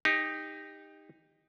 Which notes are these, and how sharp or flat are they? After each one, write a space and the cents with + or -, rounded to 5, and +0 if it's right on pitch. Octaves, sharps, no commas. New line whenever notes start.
D#4 +0 G4 +25